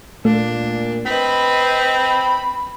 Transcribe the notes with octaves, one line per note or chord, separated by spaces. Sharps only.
A#2 A3 D4
C4 B4 D#5 B5